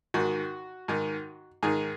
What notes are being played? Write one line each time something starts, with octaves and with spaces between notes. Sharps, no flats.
G#2 D#3 F#4
G#2 D#3
G#2 D#3 G#4